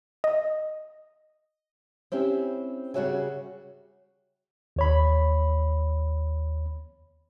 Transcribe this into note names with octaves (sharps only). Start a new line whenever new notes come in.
D#5
C4 C#4 E4 G4
C#3 G3 F#4 C#5 E5 G#5
D#2 C#5 B5